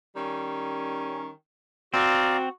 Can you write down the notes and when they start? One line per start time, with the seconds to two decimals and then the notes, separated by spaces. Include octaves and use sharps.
0.16 D#3 G3 C#4
1.94 C4 F#4 D5 F5 A#5